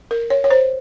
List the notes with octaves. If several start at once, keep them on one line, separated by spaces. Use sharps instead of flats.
A#4
C#5
C#5
C5